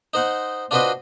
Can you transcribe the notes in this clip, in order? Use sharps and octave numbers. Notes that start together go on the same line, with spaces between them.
D#4 C5 F#5
D4 F4 F#4 B4 C5 D#5